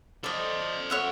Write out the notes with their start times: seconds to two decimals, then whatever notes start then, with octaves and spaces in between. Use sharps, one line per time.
0.24 A4 C5 D5 D#5
0.90 C#5 E5 F#5